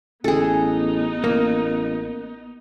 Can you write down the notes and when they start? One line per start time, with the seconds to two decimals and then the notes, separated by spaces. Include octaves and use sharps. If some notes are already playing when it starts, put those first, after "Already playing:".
0.24 A1 B3 D#4 G#4 A4
1.24 A1 A#3